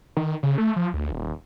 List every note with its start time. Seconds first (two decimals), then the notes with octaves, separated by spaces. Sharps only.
0.17 D#3
0.43 C#3
0.58 A3
0.76 F3
0.93 D2
1.11 D#1